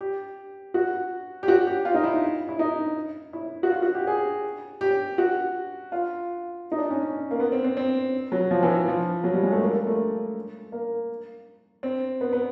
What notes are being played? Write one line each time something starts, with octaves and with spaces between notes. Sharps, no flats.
G4
F#4
G4
F#4
G4
F4
D#4
E4
E4
D#4
E4
F#4
F4
F#4
G4
G#4
G4
F#4
F4
D#4
D4
C#4
C#4
A#3
B3
C4
C4
C4
F#3
F3
E3
F3
F#3
G3
G#3
A3
A#3
A#3
A3
A#3
C4
B3
B3